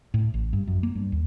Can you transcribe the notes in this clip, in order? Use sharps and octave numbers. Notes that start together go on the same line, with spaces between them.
A2
A1
G2
F#2
A#3
G2
D#2